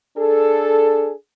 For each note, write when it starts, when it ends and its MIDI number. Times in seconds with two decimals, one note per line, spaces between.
0.18 1.12 62
0.18 1.12 68
0.18 1.12 69